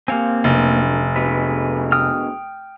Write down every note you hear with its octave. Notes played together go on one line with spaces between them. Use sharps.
C3 A#3 C4 F5 G#5
F1 F#2 D3
B2 D3 G#3 B4
G5 D#6 F6